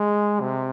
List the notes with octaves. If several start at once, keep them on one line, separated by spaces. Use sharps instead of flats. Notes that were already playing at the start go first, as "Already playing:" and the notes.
Already playing: G#3
C3